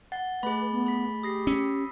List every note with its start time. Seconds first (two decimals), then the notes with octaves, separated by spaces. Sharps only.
0.12 F#5 A6 G7
0.43 A3 G#4 B4 B5
0.72 B3
0.87 B5 B6
1.23 G4 D#6 A#6 C7
1.47 C#4 E6 B6